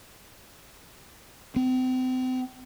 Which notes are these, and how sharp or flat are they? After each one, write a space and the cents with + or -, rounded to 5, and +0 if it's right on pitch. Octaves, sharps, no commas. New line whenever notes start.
C4 -35